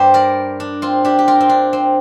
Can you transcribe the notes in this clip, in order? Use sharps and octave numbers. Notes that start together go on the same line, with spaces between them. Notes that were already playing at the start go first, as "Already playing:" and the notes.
Already playing: G2 G3 A#3 G4 C5
A#4 D5
D4
C4 F4
D4 G4
G4
F4 A#4
C4
D4
C4